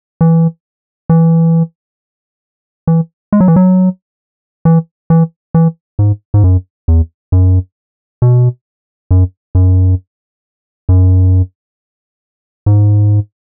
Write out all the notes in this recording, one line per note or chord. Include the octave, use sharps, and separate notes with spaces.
E3
E3
E3
G#3
F#3
E3
F#3
E3
E3
E3
G#2
G#2
F#2
E2
F#2
B2
F#2
F#2
F#2
G#2